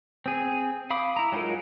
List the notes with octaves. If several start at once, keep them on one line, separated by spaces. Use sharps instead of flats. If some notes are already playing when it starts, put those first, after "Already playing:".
C4 G#4
F5 B5 D6 D#6
E4 A#5
F#3 G#3 D#4 F4 A#4